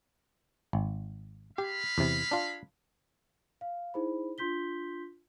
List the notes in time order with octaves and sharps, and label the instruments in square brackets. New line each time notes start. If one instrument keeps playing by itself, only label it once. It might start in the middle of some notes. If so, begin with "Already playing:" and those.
[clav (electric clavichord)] G#1
[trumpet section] G#3 F5 B5 [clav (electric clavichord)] G4
[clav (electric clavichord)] E2 C3
D4 F4
[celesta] F5
D#4 E4 G#4 C5 B5
D4 F4 C6 G6 B6 G7